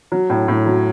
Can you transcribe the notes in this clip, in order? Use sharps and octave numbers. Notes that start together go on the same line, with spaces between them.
F#3
A2
A2
F#3